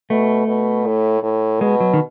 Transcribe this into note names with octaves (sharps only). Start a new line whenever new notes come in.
B2 A3
B2
A2
A2
B2 G#3
F#3
D#3